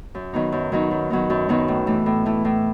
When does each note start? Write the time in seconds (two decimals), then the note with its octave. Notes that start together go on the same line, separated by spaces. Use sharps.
0.15 F#2
0.33 D#3 F#3 B3 D#4
0.52 F#2
0.72 D#3 F#3 B3 D#4
0.91 F#2
1.10 D#3 F#3 B3 D#4
1.30 F#2
1.49 D#3 F#3 B3 D#4
1.68 A2
1.87 E3 A3
2.06 A2
2.26 E3 A3
2.45 A2